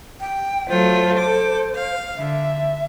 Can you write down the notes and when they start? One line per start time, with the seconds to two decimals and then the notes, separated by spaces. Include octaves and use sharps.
0.20 G5
0.69 F#3 A3 F4 C5
1.19 A4 D6
1.75 F5
2.17 D3 E5